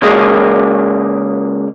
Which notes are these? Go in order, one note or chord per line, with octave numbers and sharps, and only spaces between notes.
C#3 G#3 A#3 G#4 A#4 D#5